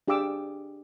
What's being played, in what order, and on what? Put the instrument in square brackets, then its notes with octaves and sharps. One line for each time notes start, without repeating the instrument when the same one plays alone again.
[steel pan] D4 G4 G#4 F5 D6 E6